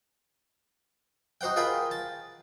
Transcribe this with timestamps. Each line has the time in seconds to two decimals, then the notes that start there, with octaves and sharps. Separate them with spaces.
1.41 D#4 F#4 C5 F#5 G5
1.56 F4 G#4 A#4 C5 G5 B5
1.91 A5